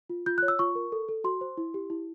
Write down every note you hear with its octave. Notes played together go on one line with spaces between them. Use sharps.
F4
F4 G6
F#6
C#5
E6
F4 C#6
A#4
A4
A4
F#4 C6
C5
E4
G4
E4